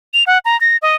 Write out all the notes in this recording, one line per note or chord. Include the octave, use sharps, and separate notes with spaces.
F7
F#5
A#5
A#6
D#5